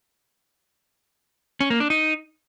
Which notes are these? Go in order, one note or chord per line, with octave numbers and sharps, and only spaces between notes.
C#4
A#3
D4
D#4